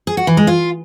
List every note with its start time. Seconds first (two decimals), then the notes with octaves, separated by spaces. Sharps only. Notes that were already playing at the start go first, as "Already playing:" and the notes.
0.07 G#4
0.17 F#4
0.27 E3
0.37 G#3
0.47 F4